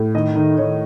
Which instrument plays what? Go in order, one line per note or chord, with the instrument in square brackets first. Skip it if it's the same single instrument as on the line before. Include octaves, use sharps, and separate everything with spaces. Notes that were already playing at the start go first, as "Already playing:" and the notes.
Already playing: [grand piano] A2
D#3 D#5
D#3
D#3 C#5